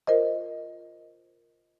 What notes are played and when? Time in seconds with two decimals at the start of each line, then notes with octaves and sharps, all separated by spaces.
0.07 F4 A#4 C5 D#5